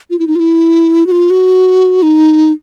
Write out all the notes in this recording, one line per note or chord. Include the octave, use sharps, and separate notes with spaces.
F4
E4
D#4
F4
E4
F#4
F4
F#4
D#4